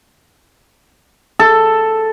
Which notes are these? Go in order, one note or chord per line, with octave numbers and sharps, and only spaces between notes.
A4